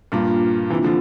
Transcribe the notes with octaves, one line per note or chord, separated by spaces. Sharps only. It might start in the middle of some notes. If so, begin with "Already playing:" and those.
G2 A#2 A#3 D4 F4
C3 E3
D3 F3